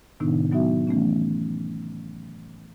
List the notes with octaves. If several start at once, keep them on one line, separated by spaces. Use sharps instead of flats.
A2 C3 D#3 B3 D4 D#4
F#3 B3 D#4 F#4 E5
E3 A3 B3 C#4